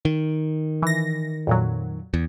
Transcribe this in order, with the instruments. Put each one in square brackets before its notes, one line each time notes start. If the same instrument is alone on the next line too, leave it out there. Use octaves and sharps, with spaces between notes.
[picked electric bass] D#3
[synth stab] E3 A#6
F2 A#2 F#3
[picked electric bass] E2